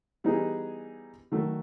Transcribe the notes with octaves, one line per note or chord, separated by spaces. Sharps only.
E3 G3 B3 D#4 G#4
D#3 F#3 A3